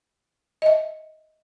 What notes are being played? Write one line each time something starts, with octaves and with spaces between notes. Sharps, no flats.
D#5 E5